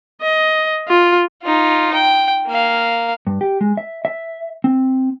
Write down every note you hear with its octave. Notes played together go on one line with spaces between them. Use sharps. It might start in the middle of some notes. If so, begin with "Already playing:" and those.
D#5
F4
D#4 F4
G5
A#3 F5
G2
G4
G#3
E5
E5
C4